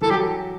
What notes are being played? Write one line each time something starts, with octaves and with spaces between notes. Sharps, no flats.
E3 A4
F#3 G4